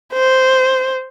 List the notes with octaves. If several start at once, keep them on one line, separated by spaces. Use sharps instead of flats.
C5